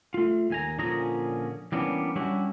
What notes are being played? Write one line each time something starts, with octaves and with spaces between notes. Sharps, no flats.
A3 F4
D#2 G#5 A#5
A#2 D3 F3 C#4 G#4 A#5
E3 G3 A#3 B3 C#4 D4
G3 C#4 D4 E4 F#4